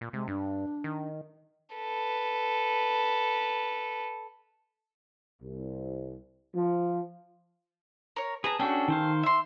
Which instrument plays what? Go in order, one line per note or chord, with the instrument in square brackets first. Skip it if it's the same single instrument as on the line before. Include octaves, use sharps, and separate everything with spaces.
[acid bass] A#2
[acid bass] C3 [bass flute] G#3
[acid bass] G2 [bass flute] D4
[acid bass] D#3
[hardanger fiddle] A4 B4
[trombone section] C2
F3
[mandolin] A#4 C#5
[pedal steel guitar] G#4 [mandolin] B4 A5 A#5
[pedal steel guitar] C#4 D4 F#4 [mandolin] G#4 A4 G5
[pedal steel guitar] D#3 C5 F5
[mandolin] E5 C6